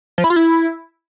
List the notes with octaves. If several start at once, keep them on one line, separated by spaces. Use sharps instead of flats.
F3
E4
F4
E4